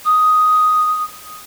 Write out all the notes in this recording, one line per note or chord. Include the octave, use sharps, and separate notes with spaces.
D#6